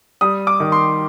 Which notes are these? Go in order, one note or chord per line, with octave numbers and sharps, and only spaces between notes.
G3 D#6
D6
D#3
C6